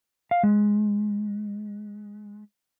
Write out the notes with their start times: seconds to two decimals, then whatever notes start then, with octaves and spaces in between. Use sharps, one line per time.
0.31 F5
0.43 G#3